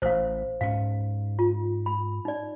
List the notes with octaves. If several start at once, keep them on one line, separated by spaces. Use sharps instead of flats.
A1 C5 F5
G#2 C#4 F5
F4
B5
D#4 D5